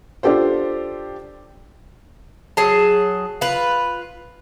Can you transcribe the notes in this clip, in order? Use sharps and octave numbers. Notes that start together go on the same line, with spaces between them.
D4 F4 G4 A4 C5
F#3 G#4 A5
F4 B4